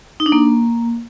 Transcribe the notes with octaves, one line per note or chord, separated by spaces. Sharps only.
D#4
D4
A#3